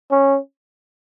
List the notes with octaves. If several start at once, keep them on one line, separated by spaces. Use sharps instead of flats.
C#4